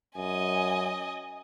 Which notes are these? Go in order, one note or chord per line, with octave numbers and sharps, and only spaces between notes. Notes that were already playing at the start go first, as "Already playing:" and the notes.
F#2 D#5 G#5